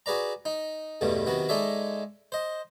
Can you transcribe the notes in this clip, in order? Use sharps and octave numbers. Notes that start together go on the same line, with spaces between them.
F#4 G#4 B4 D5 A#5
D#4
E2 G2 B2 D3 A3
C3 D#3 F#3 B3 F#4
G#3 D#4 A4 C#5 D5 E5
C5 D#5